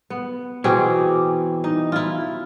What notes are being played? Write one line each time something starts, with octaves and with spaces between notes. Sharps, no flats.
B3
B2 E3 C4 G#4 G5 D6
D#4
E4 F4